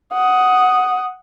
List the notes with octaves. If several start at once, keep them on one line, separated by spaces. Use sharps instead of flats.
F#5 D#6